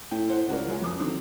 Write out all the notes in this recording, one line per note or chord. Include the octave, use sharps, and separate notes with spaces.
A2 G5
E4 C5 F#5
C#2 F#4 A#4 D5
F#3 G#3 F4
F2 D6 D#6
D3 D#3 F#3 C4